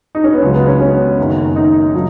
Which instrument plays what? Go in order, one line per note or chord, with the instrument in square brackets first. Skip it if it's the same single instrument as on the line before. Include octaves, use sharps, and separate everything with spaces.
[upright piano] D#4
C#4
B3
C#2 C#3 F#3 G#3
B3
C#4
C#4
F#1 F#2 D#3
D#4
C#3 F#3